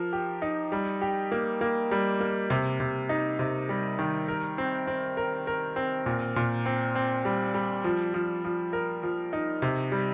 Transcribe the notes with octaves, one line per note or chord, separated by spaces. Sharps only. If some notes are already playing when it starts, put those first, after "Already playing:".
Already playing: F3 A#4
G4
D#4
G3
G4
A#3
A#3
G3
A#3
C3
C3
D#4
C3
G3
D#3
A#4
C4
C4
A#4
A#4
C4
A#2
A#2
C4
C4
G3
G3
F3
F3
F3
A#4
F3
D#4
C3
G3